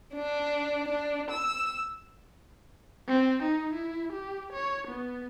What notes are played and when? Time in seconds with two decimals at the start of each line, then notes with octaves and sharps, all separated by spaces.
0.14 D4
0.88 D4
1.31 E6
3.08 C4
3.43 D#4
3.74 E4
4.12 G4
4.53 C#5
4.88 B3